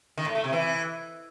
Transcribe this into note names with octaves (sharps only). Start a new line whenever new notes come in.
D#3
A2
A3
C3
E3